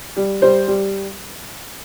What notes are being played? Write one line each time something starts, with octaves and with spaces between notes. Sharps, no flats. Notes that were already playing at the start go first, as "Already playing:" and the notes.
G3
G3 C5
G3